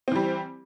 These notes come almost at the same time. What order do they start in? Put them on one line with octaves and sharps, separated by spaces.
C4 E3 G3